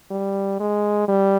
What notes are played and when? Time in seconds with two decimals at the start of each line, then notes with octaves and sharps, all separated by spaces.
0.11 G3
0.60 G#3
1.08 G3